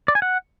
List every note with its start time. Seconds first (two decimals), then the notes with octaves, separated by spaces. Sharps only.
0.08 D5
0.15 G#5
0.22 F#5